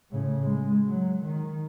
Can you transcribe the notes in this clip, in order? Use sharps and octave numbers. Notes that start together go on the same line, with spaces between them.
A2 C#3
G#3
F#3
D#3